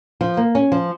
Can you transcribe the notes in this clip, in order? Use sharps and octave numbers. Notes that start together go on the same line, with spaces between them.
F3
A#3
C#4
F3